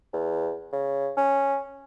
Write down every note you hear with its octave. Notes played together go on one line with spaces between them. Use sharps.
E2
C#3
C#4